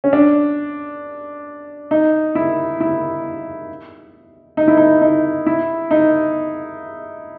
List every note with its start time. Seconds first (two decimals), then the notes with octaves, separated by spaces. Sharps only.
0.04 C#4
0.13 D4
1.91 D#4
2.35 E4
2.80 E4
4.57 D#4
4.68 E4
4.77 D#4
5.02 D#4
5.46 E4
5.91 D#4